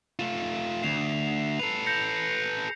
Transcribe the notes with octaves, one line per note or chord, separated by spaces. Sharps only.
A3 F4 E7
D2 C7 E7 F7
A4 B4 C7 F7
G6 A#6 C#7